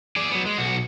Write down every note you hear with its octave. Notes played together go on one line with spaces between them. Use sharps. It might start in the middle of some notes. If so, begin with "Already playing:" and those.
G#4 D5
F#3 B3
G#3
B1 F#4